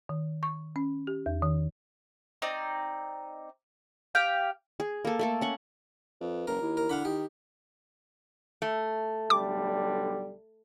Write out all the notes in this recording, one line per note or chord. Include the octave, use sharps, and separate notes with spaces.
D#3
C#6
C#4
G4
E2
D#3
C4 D#4 D5
G4 F5 G5
G#4
A#3 A4
A3 A#3 A4
C#4 F#5 C#6
F2 B4
F#1 A#4
D#2 E4
A#4
D3 F5 F#5 B5
D#3 G4
A3
B1 D3 G3 D6